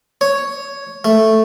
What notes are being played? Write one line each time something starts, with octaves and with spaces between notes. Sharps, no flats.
C#5
A3